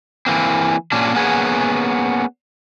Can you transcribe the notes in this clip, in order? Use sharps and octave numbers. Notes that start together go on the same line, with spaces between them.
E3 A#3 C4
A#2 C#4 D4
A#3 B3 C#4 G#4